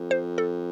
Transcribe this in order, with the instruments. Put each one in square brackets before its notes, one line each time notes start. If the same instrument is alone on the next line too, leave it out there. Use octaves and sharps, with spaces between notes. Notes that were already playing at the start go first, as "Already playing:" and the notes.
Already playing: [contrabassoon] F2
[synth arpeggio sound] C5
A4